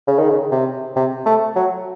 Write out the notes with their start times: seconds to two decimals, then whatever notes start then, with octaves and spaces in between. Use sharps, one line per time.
0.07 C#3
0.19 D#3
0.30 C#3
0.52 C3
0.96 C3
1.26 A3
1.56 F#3